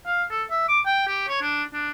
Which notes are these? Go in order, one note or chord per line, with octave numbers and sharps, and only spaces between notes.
F5
A4
E5
D6
G5
G4
C#5
D4
D4